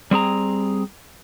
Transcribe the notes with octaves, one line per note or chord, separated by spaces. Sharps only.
G3 C4 G#4 A#5